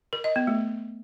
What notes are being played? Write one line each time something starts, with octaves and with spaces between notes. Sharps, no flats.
A#4
D#5
B3
A3